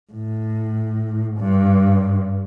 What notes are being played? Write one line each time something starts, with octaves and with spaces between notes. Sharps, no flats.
A2
G2